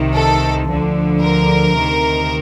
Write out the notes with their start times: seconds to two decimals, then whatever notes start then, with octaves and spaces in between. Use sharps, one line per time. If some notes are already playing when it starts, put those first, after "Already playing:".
Already playing: C2 C3 D#3
0.15 A4
0.69 D2 D3 F3
1.23 A#4
1.77 D2 C3 D#3